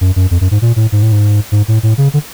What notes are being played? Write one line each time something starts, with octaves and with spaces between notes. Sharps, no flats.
F#2
F#2
F2
F#2
G#2
A#2
A2
G#2
A2
G#2
G#2
A2
A2
C#3
D3